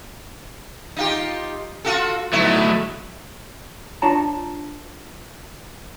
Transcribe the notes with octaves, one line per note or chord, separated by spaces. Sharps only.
D#4 F4 G4
F4 F#4 A4
F#3 A3 B3 D#4 E4
D4 F4 C#5 A5 A#5